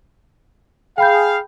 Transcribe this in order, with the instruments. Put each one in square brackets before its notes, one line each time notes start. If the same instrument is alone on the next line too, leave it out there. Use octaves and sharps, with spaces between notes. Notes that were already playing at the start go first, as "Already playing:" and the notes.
[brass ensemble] G#4 F5 [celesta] G5 B5 G6